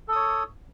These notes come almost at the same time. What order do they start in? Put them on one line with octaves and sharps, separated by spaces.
A4 D#6 C#5